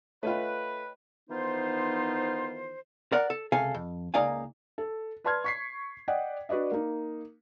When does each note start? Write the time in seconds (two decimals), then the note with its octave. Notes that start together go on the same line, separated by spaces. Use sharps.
0.23 A3 F4 B4 C#5 D#5 G5
1.30 D#3 E3 B3 D#4 F4 C5
3.12 A#4 D5 F#5
3.30 A4
3.52 C#2 C3 A4 F5 G#5
3.74 F2
4.14 C#2 A#3 D#4 D5 F5 G#5
4.78 A4
5.24 B4 D5 A5 C6 F6 G#6
5.44 C#6 B6 C7
6.08 D5 D#5 F#5 G5
6.49 D4 F#4 B4 D5 D#5
6.71 A#3 D#4